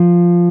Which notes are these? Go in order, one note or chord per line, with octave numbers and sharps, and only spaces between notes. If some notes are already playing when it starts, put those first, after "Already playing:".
Already playing: F3